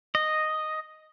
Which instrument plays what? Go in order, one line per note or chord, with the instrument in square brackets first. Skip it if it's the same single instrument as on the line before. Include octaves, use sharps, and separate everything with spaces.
[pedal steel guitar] D#5